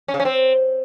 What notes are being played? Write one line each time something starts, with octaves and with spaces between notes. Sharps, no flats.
C#4
C#3
C#4
C4